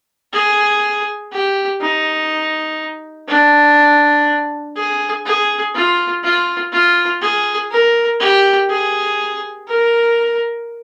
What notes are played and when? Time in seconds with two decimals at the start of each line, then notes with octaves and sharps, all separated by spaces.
0.33 G#4
1.32 G4
1.81 D#4
3.28 D4
4.76 G#4
5.25 G#4
5.74 F4
6.23 F4
6.72 F4
7.21 G#4
7.71 A#4
8.20 G4
8.70 G#4
9.68 A#4